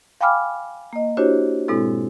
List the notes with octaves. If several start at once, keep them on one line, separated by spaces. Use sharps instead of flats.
F5 G5 G#5 B5 D6 F6
A#3 D#5
D4 E4 F#4 G4 C5 C#5
G#2 B2 G#3 C4 E4 A4